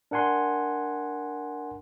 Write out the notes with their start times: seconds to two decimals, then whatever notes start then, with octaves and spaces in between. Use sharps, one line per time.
0.11 D4 A#4 F#5 G#5 C6